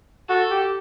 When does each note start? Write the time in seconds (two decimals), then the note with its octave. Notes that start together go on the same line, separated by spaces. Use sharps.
0.29 F#4 A4
0.51 G4